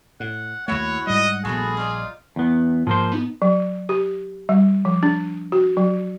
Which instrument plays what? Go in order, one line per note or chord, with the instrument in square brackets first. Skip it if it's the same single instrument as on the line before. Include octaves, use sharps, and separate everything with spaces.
[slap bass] A2 [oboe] F#5
[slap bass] D#2 A3 [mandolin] E4 F#4 [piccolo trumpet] C#5 [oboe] F#5
[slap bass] G#2 G3 [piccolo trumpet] D#5
[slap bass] A#1 G2 [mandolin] A3 B3 F4 [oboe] F#4 [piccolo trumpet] G#4
[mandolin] D#4 D5 A#5 [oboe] F4
[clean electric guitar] E2 B3
[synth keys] G#2 [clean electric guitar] F3 A#3 C5
[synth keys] B3 D#4
[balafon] F#3
G4
G3
F3
D4
F#4
F#3